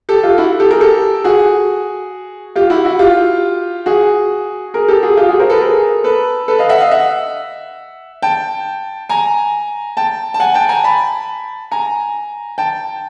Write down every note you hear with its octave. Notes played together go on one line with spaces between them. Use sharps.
G4 A4
F4 G4
E4 F#4
G4 A4
G#4 A#4
G4 A4
F#4 G#4
F4 G4
E4 F#4
E4 F#4
F4 G4
F#4 G#4
G#4 A#4
G4 A4
F#4 G#4
F4 G4
F#4 G#4
A#4 C5
A4 B4
G#4 A#4
A4 B4
A4 B4
D#5 F5
E5 F#5
D#5 F5
E5 F#5
G5 A5
G#5 A#5
G5 A5
A5
F#5 G#5
G5 A5
G#5 A#5
A5 B5
G#5 A#5
G5 A5